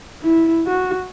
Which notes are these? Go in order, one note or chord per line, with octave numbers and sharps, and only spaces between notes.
E4
F#4